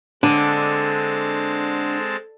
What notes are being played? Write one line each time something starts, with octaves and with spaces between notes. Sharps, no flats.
D3 G#3 C4 D4 A5